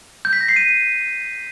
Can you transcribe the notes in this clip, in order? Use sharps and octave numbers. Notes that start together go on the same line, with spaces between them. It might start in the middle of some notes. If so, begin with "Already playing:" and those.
G6
B6
A#6
C7
D#7